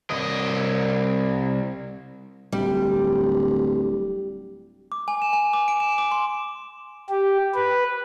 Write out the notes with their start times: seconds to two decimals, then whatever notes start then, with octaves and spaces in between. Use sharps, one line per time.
0.10 C2 D#5
2.52 D1 G3
4.92 D6
5.08 G#5
5.22 E7
5.33 G#5
5.53 D6
5.68 D7
5.80 E7
5.98 D6
6.12 C6
7.09 G4
7.55 B4